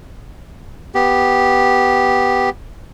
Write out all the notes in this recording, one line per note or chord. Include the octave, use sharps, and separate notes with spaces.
B3 G4